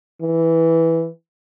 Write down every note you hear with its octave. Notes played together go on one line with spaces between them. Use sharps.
E3